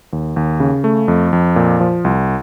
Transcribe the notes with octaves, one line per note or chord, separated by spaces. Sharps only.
D#2
D#2
C#3
A3
F2
F2
A#2
F3
C2